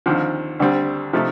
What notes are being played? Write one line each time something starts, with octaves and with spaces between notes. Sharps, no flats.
D#2 D3 F3 C4
D2 D3 G3 C4
C3 F3 A3 D#4